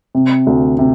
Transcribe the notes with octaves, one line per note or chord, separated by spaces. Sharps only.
C3
D2
C3